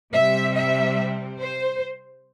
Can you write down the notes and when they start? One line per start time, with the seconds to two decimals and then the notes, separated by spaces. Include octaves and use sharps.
0.13 C3 G3 C4 E5
0.55 E5
1.39 C5